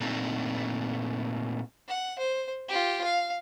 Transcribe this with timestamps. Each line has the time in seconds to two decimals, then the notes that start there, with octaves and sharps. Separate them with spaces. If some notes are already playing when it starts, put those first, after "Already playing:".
0.01 A#2 A3 C4 D4 D#4
1.88 F#5
2.19 C5
2.69 F4 G4
3.04 F5